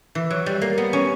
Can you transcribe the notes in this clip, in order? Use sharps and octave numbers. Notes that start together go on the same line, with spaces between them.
E3
F#3
G3
A#3
B3
C#4